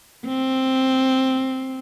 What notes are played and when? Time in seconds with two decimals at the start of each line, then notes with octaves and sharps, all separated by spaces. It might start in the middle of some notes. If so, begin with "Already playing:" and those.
0.27 C4